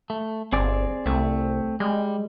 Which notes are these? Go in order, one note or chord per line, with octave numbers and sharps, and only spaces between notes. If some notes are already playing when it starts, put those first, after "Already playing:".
A3
G1 C4 G#4 D5
C2 A3 C4
G3 G#3